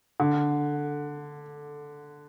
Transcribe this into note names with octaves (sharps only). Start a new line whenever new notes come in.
D3